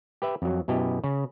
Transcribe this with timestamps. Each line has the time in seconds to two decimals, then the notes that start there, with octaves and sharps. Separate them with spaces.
0.22 G4 B4 E5
0.42 F2 F#3
0.68 F#2 B2 E4 G4 D#5
1.04 C#3